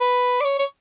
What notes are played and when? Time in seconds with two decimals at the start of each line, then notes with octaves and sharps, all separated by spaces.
0.01 B4
0.41 D5
0.44 C#5
0.59 C#5